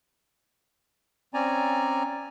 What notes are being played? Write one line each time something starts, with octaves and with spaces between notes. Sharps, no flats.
C4 C#4 D5 G#5 A#5